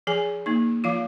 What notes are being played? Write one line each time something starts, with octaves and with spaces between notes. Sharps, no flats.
F3 G#4 G#5
A#3 D#4
F3 F4 F5